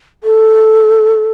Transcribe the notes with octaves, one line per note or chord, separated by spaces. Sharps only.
A4